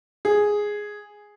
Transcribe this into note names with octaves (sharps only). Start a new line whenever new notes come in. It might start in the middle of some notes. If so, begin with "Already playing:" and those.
G#4